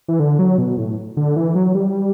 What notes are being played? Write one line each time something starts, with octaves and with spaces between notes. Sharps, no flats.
E3
D3
F#3
B2
A2
D3
E3
F#3
G3